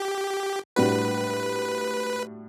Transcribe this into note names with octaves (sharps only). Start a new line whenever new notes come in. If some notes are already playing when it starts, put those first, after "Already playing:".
Already playing: G4
A2 G3 D4 F#4 B4